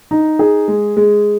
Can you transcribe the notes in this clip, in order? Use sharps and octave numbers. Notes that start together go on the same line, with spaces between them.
D#4
G#4
G#3
G#3